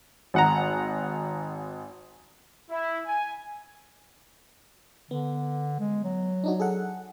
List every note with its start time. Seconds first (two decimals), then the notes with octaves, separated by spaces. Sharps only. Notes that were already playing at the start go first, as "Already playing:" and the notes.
0.34 G#1 F#5 A#5
2.70 E4
3.06 G#5
5.11 D3 B3
5.80 G#3
6.04 F#3
6.44 D4 D#4 F#4
6.60 G#4 A4 F#5